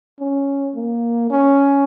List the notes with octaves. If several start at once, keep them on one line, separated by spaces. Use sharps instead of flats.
C#4
A#3
C#4